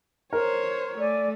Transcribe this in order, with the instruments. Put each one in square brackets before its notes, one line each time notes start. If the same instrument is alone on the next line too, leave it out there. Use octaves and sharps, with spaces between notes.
[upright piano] A#4 [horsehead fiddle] C5 C#5
[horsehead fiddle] A3 [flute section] D5 G#5